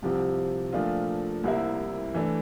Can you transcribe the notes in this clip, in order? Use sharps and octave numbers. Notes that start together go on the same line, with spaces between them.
C2 C3 F3 C4 G4
A#2 F3 A3 D4 F4
C2 C3 G3 A#3 E4
E3 A3 D4